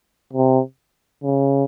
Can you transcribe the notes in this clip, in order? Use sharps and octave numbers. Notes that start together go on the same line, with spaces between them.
C3
C#3